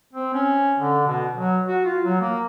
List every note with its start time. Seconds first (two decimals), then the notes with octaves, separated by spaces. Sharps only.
0.13 C4
0.34 C#4
0.80 D3
1.07 B2
1.35 F#3
1.67 F#4
1.85 F4
2.04 F#3
2.20 A#3